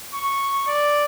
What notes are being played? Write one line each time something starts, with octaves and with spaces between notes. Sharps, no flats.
C#6
D5